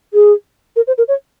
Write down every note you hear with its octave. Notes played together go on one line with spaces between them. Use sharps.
G#4
A#4
C5
A#4
C#5